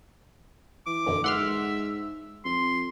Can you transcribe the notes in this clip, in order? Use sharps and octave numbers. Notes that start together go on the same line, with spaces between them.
E3 D6
B1 F#2 D3 E3
G#2 E5 F#5 C6 F6
F2 C6